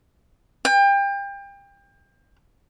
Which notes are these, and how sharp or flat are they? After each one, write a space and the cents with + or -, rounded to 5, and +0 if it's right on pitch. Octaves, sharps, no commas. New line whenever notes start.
G5 +30